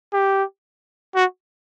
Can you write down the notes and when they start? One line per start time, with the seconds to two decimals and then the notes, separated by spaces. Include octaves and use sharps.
0.13 G4
1.15 F#4